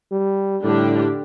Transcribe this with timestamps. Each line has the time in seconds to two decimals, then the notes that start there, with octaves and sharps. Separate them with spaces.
0.12 G3
0.64 A2 D3 G3 D4 G4